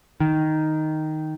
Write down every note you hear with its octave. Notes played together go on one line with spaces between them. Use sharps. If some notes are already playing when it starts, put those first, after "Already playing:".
D#3